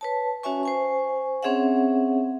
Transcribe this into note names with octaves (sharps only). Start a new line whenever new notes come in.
B4 C#5 A5
C#4 F#4 C#5 E5 G#5 C#6
C5 G#5 C#6
C4 C#4 G#4 C#5 E5 F#5